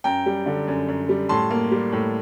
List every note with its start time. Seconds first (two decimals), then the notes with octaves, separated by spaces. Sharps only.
0.04 F#2 G5 A#5
0.26 G3
0.46 D3
0.68 F#2
0.88 F#2
1.09 G3
1.29 A2 A5 C6
1.51 A#3
1.71 G3
1.92 A2